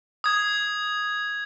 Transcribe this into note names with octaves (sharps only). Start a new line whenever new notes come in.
D#6 G#6